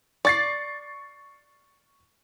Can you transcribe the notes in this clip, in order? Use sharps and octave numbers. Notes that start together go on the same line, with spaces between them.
D5 C#6 A6 C7